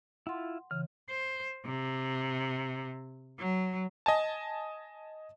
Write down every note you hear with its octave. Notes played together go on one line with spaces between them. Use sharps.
E4 F4 F#5 C6
C#3 E3 F6
C5
C3
F#3
D#5 G#5 A5